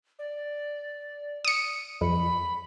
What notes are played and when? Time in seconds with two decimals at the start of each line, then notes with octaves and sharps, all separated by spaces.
0.19 D5
1.45 D#6 C#7
2.01 F2 B5